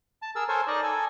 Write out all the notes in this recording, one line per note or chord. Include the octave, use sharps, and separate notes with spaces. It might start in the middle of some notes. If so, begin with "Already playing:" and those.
A5
G#4 A#4 E6
A4 A#4 C5 C#5 G#5
D#4 D5 D#5
A4 G#5